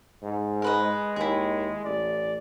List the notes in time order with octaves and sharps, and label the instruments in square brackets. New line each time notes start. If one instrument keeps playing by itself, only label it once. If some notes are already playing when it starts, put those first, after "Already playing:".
[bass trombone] G#2
[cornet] G#3 [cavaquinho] A#4 B4 D#5
[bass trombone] D#2 [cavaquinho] E4 G#4
[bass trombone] A1 [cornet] D5